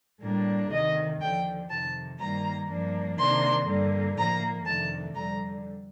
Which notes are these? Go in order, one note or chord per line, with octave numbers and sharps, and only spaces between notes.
A2 G3 A#3 D4
D2 C3 D#3 D#5
D#2 D3 F3 G5
F2 C3 D#3 A5
G2 D#3 G3 A#3 A#5
G2 F3 A#3 D4
C3 D#3 A#3 D4 C6
G2 D3 G3 A#3
A2 F3 A#3 A#5
F2 C3 D#3 A3 D4 A5
F2 D3 G3 A#5